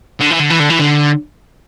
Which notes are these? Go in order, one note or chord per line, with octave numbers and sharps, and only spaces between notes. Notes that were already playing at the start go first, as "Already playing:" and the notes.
D3
E3
D3
E3
D3
E3
D3